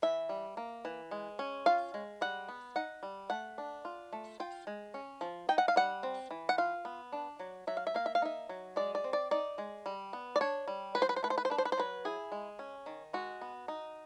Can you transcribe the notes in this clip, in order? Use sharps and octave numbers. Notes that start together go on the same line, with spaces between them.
E3 E5
G3
A#3
E3
G#3
C#4
F4 F5
G#3
G3 F#5
B3
D#4 F#5
G3
A3 F#5
D4
F4
A3
F4 G5
G#3
C#4
F3
D#4 G5
F#5
F5
G3 F#5
C4
E3
F#5
F4 F5
B3
D4
F#3
F#3 E5
F5
E5
A#3 F5
E5
F5
D#4 E5
F#3
G#3 D5
D5
C4
D5
D#4 D5
G#3
G3
B3
D5
D4 C#5
G3
F#3 B4
C5
B4
C5
A3 B4
C5
B4
C5
D4 B4
C5
B4
C5
F#3 B4
E4 G#4
G#3
C#4
D#3
G#3 F#4
B3
D#4